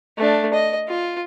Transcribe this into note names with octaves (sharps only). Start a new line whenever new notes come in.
A3 D4
D#5
F4